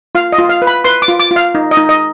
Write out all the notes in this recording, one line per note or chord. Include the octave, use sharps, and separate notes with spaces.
F4 F5
D#5
F4
F5
B4
B5
B4 C6
D6
F4
D6
F4
F5
D#4
D#5
D#4
D#5